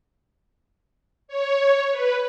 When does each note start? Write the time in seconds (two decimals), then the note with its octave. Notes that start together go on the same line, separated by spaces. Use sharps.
1.28 C#5
1.91 B4